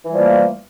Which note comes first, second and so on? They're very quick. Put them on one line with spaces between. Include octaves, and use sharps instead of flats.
E3 G3 F3 A#3 A3